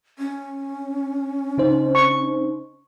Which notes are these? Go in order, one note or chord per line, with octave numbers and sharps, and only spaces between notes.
C#4
C#3 D#4 C5
C#6